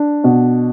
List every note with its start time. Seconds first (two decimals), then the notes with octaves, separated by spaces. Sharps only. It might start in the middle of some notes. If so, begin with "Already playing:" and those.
Already playing: D4
0.24 B2